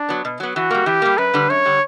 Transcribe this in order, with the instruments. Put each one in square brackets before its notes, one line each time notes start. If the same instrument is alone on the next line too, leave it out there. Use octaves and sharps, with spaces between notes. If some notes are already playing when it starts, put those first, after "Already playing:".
Already playing: [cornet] D4
[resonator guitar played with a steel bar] F#3 B3
B2
F#3 B3
[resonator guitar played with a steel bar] E3 [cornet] F#4
[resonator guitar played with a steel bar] G3 A#3
[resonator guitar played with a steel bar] E3 [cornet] G4
[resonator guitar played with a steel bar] G3 A#3
[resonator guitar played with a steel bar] F#2 [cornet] B4
[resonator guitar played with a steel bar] D3 G3
[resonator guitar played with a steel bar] F#2 [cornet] C#5
[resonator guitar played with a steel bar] D3 G3